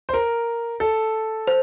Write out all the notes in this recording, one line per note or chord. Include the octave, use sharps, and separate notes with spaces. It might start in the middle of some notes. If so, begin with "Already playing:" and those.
C5
A#4
A4
C5